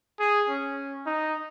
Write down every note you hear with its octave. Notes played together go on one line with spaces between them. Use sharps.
G#4
C#4
D#4